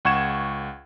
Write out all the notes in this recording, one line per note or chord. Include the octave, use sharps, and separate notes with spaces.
C#2 F#5 C#6 G#6 E7